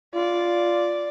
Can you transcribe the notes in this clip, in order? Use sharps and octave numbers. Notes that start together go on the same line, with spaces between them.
F4 D5